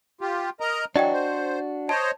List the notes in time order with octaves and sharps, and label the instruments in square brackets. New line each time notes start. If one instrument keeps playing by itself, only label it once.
[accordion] F4 G4
A#4 D#5 A#5
[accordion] E3 F#3 [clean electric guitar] D4 F#4 [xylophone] D5 D#5 G5
[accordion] C5
[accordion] C5 C#5 D#5 [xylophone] A5